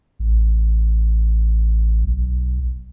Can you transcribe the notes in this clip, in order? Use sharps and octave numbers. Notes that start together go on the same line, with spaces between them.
A1
B1